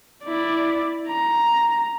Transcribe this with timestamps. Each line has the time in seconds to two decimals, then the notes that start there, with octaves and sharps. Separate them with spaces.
0.24 E4 D5
1.08 A#5